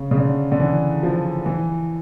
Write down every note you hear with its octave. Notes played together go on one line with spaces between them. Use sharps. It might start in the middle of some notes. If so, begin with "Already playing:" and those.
Already playing: C#3
C#3
D3
D3
E3
F3
E3